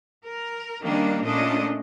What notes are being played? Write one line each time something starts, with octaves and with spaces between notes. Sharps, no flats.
A#4
D#3 G3 A#3 C#4 D4
A#2 A3 C#4 D4 D#5